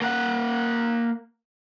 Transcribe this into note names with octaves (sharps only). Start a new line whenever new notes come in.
A#3 F#5